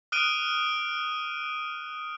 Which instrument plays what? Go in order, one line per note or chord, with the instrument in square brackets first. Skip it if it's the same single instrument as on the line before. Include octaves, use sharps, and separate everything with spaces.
[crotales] D#6 F6 F#6 D7 D#7 G7